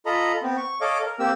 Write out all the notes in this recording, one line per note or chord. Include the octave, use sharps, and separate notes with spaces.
F4 A4 D#5 A#5 B5
B3 C4
C#6
A4 C#5 D#5 F5 D6
A#4
A#3 C4 G4 E6